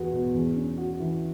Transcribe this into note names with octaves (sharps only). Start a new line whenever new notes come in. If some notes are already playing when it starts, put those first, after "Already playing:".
Already playing: E2 B3 F#4
B2
E2
C#4
F#4
E3